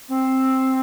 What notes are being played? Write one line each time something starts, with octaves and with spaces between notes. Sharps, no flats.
C4